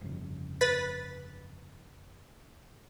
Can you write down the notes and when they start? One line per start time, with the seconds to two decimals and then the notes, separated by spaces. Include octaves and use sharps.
0.01 G1 F2 C#3
0.61 B4 A6 B6